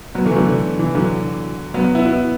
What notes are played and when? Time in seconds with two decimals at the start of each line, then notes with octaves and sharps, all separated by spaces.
0.14 F#3 B3
0.26 E3 A3
0.36 D3 F#3
0.46 D3
0.79 E3
0.95 D3 F#3
1.74 F#3 B3
1.95 B3 E4
2.05 B3 E4